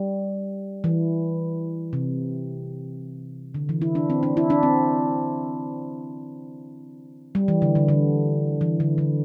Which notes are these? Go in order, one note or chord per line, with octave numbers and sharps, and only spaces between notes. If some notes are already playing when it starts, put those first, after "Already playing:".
Already playing: G3
E3
C3
D3
E3
E4
D4
C4
D4
E4
D4
C4
G3
E3
D3
D3
D3
E3
D3
D3